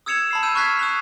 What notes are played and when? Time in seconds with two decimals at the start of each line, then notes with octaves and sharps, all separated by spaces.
0.06 D#6 E6 G#6 C#7 E7 F7
0.31 A5 B5 C7
0.43 E6 G6 D#7
0.55 C#6 F6 F#6 G#6 B6 C7
0.79 D#6 F#6 F7